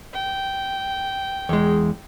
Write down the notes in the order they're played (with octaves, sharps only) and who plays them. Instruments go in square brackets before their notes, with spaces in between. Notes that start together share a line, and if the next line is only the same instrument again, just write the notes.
[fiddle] G5
[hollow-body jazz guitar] E2 G#3